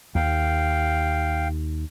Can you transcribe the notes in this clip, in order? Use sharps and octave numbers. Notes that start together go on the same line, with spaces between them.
D#2 F5 G5